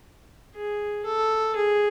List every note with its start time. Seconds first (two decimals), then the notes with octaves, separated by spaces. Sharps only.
0.55 G#4
1.05 A4
1.56 G#4